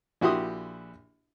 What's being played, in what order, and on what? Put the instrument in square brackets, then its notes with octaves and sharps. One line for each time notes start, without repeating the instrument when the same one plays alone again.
[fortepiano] A#1 E4 F#4 G4 C6 D#6